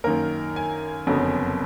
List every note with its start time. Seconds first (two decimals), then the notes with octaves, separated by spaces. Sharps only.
0.04 F#2 D#3 A#3 A#4
0.56 G#5
1.07 F#1 F2 D3 F#3 B3